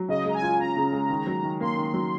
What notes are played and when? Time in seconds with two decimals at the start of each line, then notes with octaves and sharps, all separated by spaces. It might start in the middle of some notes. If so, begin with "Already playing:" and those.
Already playing: F#3
0.09 C#3 D#5
0.25 G#3 A#5
0.34 G#5
0.42 F4
0.59 C#4 A#5
0.76 C#3
0.92 G#3
1.10 D#3
1.27 F#3
1.43 D#3
1.60 A#3 C6
1.77 D#3
1.94 F#3